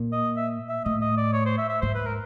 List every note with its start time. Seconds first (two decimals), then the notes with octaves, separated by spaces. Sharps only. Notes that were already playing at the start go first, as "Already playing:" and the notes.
Already playing: A#2
0.13 D#5
0.36 E5
0.69 E5
0.85 A2 D#5
1.01 D#5
1.17 D5
1.33 C#5
1.46 C5
1.58 E5
1.69 E5
1.81 G#2 C5
1.95 B4
2.06 A#4